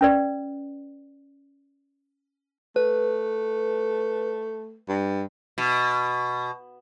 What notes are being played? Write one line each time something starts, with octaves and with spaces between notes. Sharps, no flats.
C#4 B4 D5
A3 B4
G2
B2